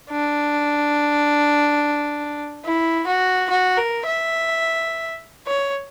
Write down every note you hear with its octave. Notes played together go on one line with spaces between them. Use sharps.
D4
E4
F#4
F#4
A#4
E5
C#5